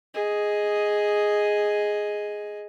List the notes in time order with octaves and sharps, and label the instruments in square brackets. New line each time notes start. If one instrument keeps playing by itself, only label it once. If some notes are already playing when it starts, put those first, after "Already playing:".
[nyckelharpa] G#4 D#5